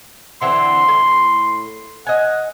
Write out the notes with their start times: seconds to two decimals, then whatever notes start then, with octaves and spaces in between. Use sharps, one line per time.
0.42 D3 E3 C4 C6
0.88 A2
2.07 D#5 F#5 G#5